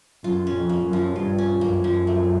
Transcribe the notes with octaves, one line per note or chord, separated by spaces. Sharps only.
F#2 F4
C#4
F2
A#3
F#2
F3
G2 F4
C#4
F#2 A#3
F3
A3